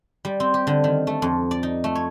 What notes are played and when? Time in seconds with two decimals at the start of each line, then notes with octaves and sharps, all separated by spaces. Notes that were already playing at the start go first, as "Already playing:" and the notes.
0.25 G3
0.40 C4
0.54 G4
0.67 D3
0.84 D#3
1.07 A3
1.22 F2
1.51 D5
1.63 D#4
1.84 A3
1.95 C#5